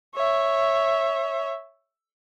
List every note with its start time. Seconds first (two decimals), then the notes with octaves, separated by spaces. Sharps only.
0.15 C#5 E5